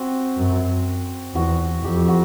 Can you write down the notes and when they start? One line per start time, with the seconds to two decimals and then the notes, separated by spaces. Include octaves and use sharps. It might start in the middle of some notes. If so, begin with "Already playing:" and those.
Already playing: C4 F#4
0.38 F#2
1.35 E2 F#4
1.84 F2 G4
2.08 F#4